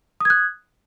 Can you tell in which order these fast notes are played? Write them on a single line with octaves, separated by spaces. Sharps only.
D#6 G#6 F#6